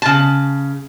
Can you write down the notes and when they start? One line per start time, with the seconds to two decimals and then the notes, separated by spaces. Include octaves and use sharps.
0.02 C#3 A5